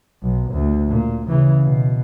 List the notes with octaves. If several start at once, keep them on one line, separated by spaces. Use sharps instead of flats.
B1
D2
A#2
C#3 E3
B2